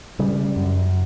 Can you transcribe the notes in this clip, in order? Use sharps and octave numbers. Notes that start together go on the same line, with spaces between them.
C#3 G3
F#2